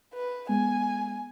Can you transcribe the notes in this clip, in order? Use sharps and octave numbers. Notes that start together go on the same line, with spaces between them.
B4
G#3 B3 G#5